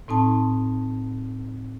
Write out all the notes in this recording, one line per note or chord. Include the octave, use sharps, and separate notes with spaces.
A2 C4 D#4 A5